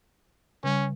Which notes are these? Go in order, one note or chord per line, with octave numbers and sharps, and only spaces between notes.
C#3 G3 C#4